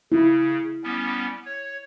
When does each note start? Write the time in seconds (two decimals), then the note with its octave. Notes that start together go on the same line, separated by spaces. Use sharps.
0.12 C#3 E4
0.84 G3 B3 C#4
1.46 C#5